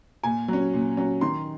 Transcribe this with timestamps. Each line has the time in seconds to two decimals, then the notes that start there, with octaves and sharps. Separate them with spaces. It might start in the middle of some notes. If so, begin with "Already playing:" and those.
0.23 A#2 G#5
0.48 F#3 C#4
0.73 A#2
0.97 F#3 C#4
1.21 D#3 C6